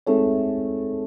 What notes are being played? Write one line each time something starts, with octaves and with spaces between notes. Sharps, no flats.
G#3 A3 C4 D#4 G#4 A4 C#5